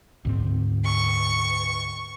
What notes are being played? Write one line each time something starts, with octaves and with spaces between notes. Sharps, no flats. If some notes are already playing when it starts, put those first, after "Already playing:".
D2 G#2 C4
C#6